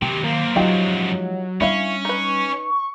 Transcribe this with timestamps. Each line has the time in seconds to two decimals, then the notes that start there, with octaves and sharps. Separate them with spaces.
0.02 C3 D#3 F#3 G4
0.24 F#2 A#3 C4
0.56 F3 F#3 G#3 D#4 F4 G4
1.61 G3 C#4 D4 E4 E5 F5 C#6
2.05 D#4 B4